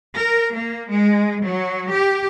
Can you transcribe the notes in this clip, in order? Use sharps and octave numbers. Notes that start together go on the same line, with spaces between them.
A#4
A#3
G#3
F#3
G4